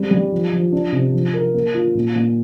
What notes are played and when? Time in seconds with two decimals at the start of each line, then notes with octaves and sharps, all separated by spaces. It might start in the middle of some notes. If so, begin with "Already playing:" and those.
Already playing: G3 C4
0.11 G3
0.32 F3
0.53 F3
0.72 D4
0.92 C3
1.14 F3
1.34 A#4
1.54 A#3
1.74 F4
1.95 A#2
2.16 A#2